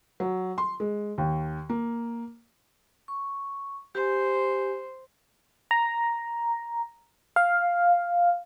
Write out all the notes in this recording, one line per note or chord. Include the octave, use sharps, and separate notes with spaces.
F#3
C6
G#3
D#2
A#3
C#6
G4 C5 G#5
A#5
F5